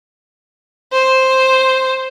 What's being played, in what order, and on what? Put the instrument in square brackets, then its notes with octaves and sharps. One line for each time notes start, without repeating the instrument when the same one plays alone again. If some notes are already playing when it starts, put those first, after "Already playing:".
[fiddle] C5